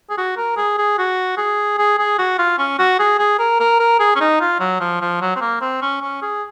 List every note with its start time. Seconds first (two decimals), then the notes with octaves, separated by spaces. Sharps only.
0.10 G#4
0.18 F#4
0.37 A#4
0.57 G#4
0.78 G#4
0.98 F#4
1.38 G#4
1.78 G#4
1.99 G#4
2.19 F#4
2.38 F4
2.58 C#4
2.79 F#4
2.99 G#4
3.19 G#4
3.39 A#4
3.60 A#4
3.80 A#4
4.00 G#4
4.16 C#4
4.21 D#4
4.41 F4
4.60 F#3
4.80 F3
5.01 F3
5.21 F#3
5.36 C4
5.41 A#3
5.61 C4
5.82 C#4
6.02 C#4
6.22 G#4